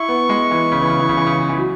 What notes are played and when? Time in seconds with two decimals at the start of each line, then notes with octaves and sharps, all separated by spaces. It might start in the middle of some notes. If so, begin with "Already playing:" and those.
Already playing: E4 C#6
0.08 B3
0.29 G#3
0.51 E3
0.72 C#3
0.81 E3
0.90 C#3
1.00 E3
1.09 C#3
1.17 E3
1.27 C#3
1.49 E3
1.57 F#3